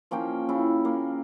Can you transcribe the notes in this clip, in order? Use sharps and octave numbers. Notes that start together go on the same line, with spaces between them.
F3 A#3 C#4 G5
C#3 E4
A#3